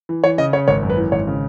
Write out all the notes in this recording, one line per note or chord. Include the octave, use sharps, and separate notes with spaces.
E3
E3 C#5
C#3 D#5
C#3 C#5
G#1 C#5
F#2
B4
E3
G#1 C#5
C#3